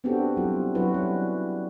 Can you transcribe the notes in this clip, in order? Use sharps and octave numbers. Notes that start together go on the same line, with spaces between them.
B3 C4 D4 F#4 G4 A4
F#3 G3 E4 F4
F#3 C#4 E4 F#4 B4
G3